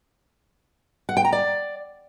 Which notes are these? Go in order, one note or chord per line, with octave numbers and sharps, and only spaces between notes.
F#5
G5
A#5
D5